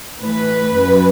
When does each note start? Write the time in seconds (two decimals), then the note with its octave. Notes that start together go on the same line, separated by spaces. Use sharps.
0.21 A2 E3 B4
0.76 F#2 F#3